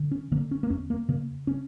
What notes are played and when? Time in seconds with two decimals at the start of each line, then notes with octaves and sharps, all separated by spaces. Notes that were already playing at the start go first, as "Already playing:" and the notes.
Already playing: D3
0.11 C#4
0.32 D3 A#3
0.51 C#4
0.63 A#3
0.70 E2 C#4
0.90 A#3
1.09 C#3 A#3
1.47 C#4